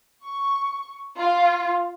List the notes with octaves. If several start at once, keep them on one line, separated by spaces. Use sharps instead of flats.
C#6
F4